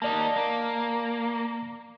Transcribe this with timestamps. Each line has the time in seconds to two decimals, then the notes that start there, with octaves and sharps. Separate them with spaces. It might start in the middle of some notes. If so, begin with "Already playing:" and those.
0.02 A#3 D#4 D5 A5
0.36 A#3